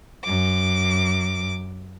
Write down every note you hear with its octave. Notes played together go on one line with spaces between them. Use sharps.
F#2 D6